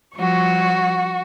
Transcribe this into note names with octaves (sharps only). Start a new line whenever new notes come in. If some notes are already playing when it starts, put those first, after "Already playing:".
F3 G3 F#4 C#6